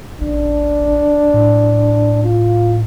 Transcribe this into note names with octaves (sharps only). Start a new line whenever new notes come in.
A1 D4
A2
F4